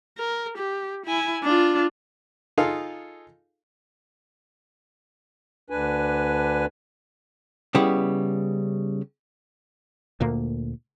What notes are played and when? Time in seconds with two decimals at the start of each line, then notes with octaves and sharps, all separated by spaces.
0.18 A#4
0.57 G4
1.06 E4 G#5
1.43 D4 F4
2.58 D#4 F4 G#4 A4 F5
5.70 D2 D4 B4 G#5
7.75 C#3 G3 B3 E4
10.21 D2 A#2 A#3